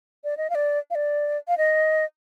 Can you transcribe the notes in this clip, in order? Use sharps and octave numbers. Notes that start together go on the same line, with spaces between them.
D5
D#5
F5
D5
F5
D5
F5
D#5